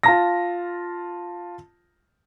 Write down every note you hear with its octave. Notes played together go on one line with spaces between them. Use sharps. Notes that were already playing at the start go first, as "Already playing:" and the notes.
F4 A5 A#6